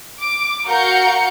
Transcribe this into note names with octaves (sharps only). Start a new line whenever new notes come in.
D6
F#4 A#4 F5 G6 C#7